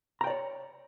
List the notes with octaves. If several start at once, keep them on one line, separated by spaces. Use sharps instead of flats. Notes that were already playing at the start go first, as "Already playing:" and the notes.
C#5 D5 G5 A#5